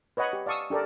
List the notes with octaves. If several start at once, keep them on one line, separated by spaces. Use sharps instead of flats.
B4 C#5 D#5 F#5 B5
G4
D5 F5 A5 C#6 D#6 E6
D4 G4 A4 A#4 D5